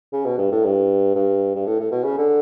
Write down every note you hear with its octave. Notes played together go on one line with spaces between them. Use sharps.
C#3
B2
G2
A2
G2
G2
G2
A2
A2
B2
C#3
D3